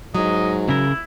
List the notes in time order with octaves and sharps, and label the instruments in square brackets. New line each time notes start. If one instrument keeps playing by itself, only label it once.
[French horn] G#2 [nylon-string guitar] F#3 [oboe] D#5
[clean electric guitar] C#3 A#4 [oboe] E4